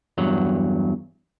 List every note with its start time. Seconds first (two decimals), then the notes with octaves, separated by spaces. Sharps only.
0.18 E2 G2 F#3